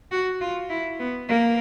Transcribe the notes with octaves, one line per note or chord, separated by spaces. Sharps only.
F#4
F4
E4
B3
A#3